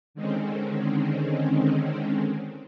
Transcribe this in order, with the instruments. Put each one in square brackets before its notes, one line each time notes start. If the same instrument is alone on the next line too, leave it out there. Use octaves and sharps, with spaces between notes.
[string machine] D3 D#3 G#3 C4 C#4